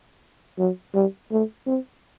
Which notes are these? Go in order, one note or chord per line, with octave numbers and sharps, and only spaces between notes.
F#3
G3
A3
C4